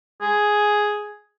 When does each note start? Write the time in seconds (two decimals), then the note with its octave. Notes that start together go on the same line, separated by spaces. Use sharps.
0.22 G#4